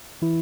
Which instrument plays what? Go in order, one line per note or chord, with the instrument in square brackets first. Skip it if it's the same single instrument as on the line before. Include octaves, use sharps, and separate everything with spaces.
[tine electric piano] E3 E4